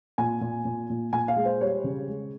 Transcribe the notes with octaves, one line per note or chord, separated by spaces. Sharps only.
A#2 G#5
A#2
A#2
A#2
A#2 G#5
F5
G#3
C5
G3 C#5
C#3
G#3